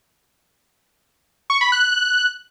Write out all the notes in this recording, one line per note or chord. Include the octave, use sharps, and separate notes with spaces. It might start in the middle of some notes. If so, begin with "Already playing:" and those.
C#6
B5
F#6